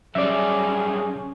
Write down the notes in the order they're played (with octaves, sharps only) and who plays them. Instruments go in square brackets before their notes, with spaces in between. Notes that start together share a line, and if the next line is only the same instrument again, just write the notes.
[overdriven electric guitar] F#2 G3 [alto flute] C#4 [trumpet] G#4 [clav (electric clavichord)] D5 E5